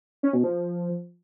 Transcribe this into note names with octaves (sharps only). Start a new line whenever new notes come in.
C#4
B2
F3